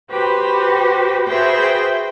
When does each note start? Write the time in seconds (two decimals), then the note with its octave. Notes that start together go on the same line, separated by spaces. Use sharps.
0.11 F#4 G4 B4 C5
1.28 F#4 G#4 B4 C5 E5 G5